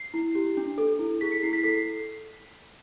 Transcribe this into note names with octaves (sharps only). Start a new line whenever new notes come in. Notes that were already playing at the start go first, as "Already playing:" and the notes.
Already playing: C7
E4
G4
D4
A4
E4
G#4 B6
C#7
E4 C7
B6
A4 C7